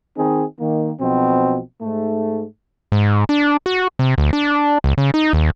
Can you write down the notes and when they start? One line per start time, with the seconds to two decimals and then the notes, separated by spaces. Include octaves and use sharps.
0.17 D#3 C4 D#4 G#4
0.60 D#3 A#3
1.00 B1 B2 F3 C4
1.81 G#2 A3
2.92 G#2
3.29 D4
3.66 F#4
3.99 C3
4.18 D2
4.33 D4
4.84 C#2
4.98 C#3
5.14 D#4
5.33 D#2